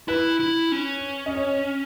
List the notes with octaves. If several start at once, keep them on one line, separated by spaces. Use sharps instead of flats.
E4 B4
E4
C#4
D#5
C#5